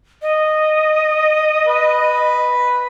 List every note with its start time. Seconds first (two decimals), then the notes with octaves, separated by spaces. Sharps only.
0.22 D#5
1.67 B4